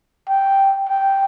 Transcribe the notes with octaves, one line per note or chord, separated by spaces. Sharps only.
G5
G5